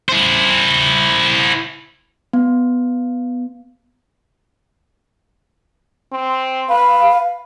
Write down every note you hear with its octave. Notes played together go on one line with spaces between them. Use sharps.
E4 C5
B3
C4
B4 F5